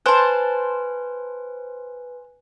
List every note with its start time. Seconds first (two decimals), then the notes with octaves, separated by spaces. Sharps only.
0.06 B4 C5 G#5 A5 F#6